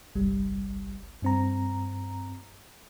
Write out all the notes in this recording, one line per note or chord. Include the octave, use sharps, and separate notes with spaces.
G1 C2 G3
G2 C4 A#5